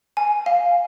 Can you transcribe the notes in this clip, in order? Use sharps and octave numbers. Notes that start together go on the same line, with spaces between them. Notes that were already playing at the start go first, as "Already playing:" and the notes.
G#5
F5